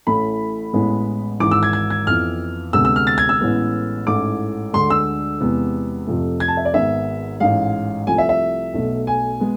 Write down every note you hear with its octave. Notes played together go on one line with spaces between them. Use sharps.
A1 A2 E3 A3 B5
A1 A2 E3 G#3 B3
G#1 G#2 E3 D6
E6
G#6
G#6
G#6
F2 E3 B3 F6
D2 C3 G#3 B3 E6
E6
F6
A6
G#6
E6
A1 A2 G#3 B3
A1 G#2 E3 A3 D6
D2 D3 G#3 C6
E6
E2 C3 G#3 B3
F2 C3 F3 A3
G#6
A5
E5
D5
G#1 G#2 G#3 B3 E5
A1 G#2 G#3 F5
C2 C3 F3 A3 G#5
E5
E5
B1 B2 A3
G#5
G#3 B3